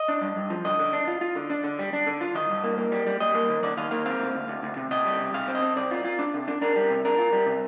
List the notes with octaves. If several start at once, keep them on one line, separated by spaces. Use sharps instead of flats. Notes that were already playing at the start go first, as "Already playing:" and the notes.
Already playing: D#5
D4
G2
G2
F3
D3 D#5
D3
D4
F4
F4
D3
D4
D3
G3
D4
D3
F4
D#3 D#5
G2
A#3
A#3
G3
G3
G3 D#5
A#3
D#3
D#3 D5
D#3 F5
A#3 F5
C4 F5
D2
D2
D2
D2
C3
C3 D#5
G3
C3
C3 F5
C4
D#5
C4
C3 D5
F4
F4
D4
C3
D4
D4 A#4
G3
C3
D4 A#4
F4
G3
C3